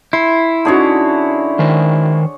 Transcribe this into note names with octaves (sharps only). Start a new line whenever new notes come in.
E4 C6
D3 C#4 D#4 F#4 G#4 C#5
D#3 C5